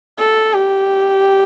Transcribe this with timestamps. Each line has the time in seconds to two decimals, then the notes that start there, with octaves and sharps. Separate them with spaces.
0.19 A4
0.54 G4